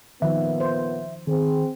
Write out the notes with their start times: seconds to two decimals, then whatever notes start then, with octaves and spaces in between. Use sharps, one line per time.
0.22 A#2 D#3 F3 B3 E5
0.60 C5
1.27 D#3 C4 G#4